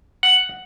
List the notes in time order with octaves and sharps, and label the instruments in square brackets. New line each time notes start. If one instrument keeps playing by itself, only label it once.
[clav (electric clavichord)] F#5